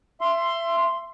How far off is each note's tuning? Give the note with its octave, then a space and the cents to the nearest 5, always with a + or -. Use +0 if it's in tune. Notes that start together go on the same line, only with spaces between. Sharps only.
E5 +30 C6 +0